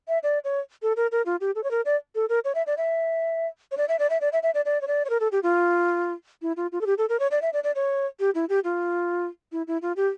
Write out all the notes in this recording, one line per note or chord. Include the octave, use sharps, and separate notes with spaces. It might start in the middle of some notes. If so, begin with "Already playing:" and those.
E5
D5
C#5
A4
A#4
A#4
F4
G4
A4
C#5
A#4
D5
A4
A#4
C#5
E5
D5
E5
C#5
D5
E5
D5
E5
D5
E5
E5
D5
D5
C#5
D5
C#5
A#4
A4
G4
F4
E4
F4
F4
A4
G4
A4
A#4
C#5
D5
E5
D5
D5
C#5
G4
E4
G4
F4
E4
E4
F4
G4